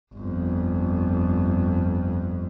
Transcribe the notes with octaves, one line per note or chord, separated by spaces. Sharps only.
G1 F2